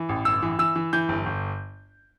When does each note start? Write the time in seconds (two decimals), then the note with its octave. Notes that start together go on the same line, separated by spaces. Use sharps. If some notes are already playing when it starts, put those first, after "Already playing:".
Already playing: E3
0.09 A1
0.25 G1 E6
0.42 E3
0.59 E3 E6
0.75 E3
0.93 E3 G6
1.09 G1
1.26 G1